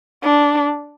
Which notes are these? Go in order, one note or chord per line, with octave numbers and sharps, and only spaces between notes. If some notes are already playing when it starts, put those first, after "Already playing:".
D4